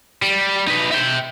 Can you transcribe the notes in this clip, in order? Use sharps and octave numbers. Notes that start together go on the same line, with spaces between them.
G3
D#4 B4
E5 G5